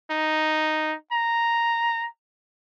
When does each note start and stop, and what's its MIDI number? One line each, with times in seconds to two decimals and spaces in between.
0.11 0.95 63
1.13 2.07 82